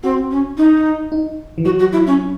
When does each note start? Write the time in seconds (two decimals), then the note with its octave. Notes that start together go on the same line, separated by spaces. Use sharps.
0.03 C4 F#4
0.31 C#4
0.57 D#4
1.12 D#4
1.58 E3
1.65 F#3 F#4
1.79 F#4
1.92 E4
2.07 C#4